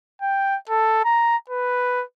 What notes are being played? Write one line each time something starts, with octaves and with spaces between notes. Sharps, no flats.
G5
A4
A#5
B4